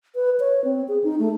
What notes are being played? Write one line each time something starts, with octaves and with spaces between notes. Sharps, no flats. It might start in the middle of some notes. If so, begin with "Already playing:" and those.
B4
C#5
C4
G#4
D#4
A3